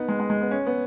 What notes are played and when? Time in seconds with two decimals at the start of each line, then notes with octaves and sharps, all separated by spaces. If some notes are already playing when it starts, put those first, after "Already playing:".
Already playing: B3 D#4
0.08 G#3
0.20 G#3
0.30 G#3
0.41 B3
0.51 C#4
0.67 B3